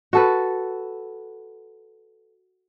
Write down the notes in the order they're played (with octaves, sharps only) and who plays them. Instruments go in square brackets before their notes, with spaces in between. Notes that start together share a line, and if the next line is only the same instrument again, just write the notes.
[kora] F#4 A4 B4